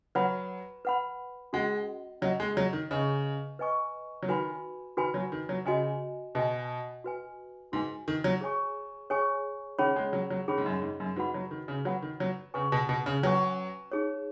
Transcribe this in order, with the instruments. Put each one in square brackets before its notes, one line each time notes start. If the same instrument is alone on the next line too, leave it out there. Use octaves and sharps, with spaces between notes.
[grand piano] F#3 [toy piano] B4 F#5 B5
[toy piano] B4 F#5 B5
[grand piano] G#3 [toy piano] C#4 F#4 D#5 F#5
[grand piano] F#3 [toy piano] C#4 F#4 D#5 F#5
[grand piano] G#3
F#3
D#3
[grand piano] C#3 [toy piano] B4 D#5 G#5 C#6
[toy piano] B4 D#5 G#5 C#6
[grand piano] F#3
[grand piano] D#3 [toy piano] F#4 B4 G#5 B5
[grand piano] D#3 [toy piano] F#4 B4 G#5 B5
[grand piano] F#3
D#3
F#3
[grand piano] C#3 [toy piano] F#4 D#5 G#5
[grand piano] B2 [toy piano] F#4 D#5 G#5
[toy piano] F#4 B4 G#5
[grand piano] G#2 [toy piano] F#4 B4 G#5
[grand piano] D#3
F#3
[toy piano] G#4 C#5 G#5 C#6
G#4 C#5 G#5 C#6
[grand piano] D#3 [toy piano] C#4 G#4 C#5 B5
[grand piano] G#3
F#3
F#3
[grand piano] D#3 [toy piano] C#4 G#4 C#5 B5
[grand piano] G#2
F#2
G#2
F#2
[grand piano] G#2 [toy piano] F#4 B4 F#5 B5
[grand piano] F#3
D#3
C#3
[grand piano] F#3 [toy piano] F#4 B4 F#5 B5
[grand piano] D#3
F#3
[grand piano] C#3 [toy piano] C#4 B4 G#5 C#6
[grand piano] B2
B2
C#3
[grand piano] F#3 [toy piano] C#4 B4 G#5 C#6
[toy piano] D#4 G#4 C#5